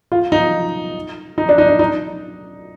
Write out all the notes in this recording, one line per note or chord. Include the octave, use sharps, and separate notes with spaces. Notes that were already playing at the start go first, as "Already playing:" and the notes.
F4
D#4
D#4
D4
D#4
D4
D#4